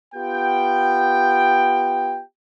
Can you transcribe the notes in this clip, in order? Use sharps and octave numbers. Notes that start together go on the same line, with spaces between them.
B3 F4 G4 G5